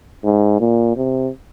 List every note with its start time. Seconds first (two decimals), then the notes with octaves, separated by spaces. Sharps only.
0.24 G#2
0.60 A#2
0.96 C3